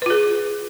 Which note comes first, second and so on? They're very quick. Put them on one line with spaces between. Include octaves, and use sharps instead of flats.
B4 F4 G#4